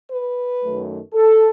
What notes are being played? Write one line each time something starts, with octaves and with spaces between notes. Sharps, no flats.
B4
F#2 D#3 F#3 A3
A4